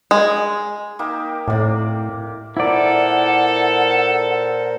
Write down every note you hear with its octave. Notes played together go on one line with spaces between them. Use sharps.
G#3
A#3 D#4 G4
A2 C3 D5
A#2 E4 A4 A#4 C5 D5 F#5